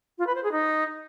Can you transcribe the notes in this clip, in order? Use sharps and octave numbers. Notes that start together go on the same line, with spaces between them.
F4
B4
C5
G#4
D#4